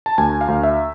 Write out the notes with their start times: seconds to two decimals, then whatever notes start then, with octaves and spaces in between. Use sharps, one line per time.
0.06 A5
0.18 D2 G#5
0.41 F5
0.48 D2
0.63 E5